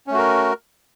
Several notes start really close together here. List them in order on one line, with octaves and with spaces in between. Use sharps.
C#4 A3 F#4 A#4